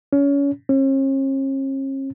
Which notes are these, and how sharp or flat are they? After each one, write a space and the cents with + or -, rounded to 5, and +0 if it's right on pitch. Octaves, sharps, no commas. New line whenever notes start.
C#4 +25
C#4 -45